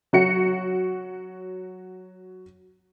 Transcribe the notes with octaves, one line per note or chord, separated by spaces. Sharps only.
F#3 F#4 C#7